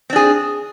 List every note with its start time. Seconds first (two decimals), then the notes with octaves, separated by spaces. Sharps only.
0.10 C4
0.13 D4
0.16 G#4